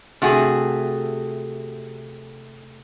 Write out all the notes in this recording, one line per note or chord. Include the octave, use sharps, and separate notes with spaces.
C3 A3 F#4 G#4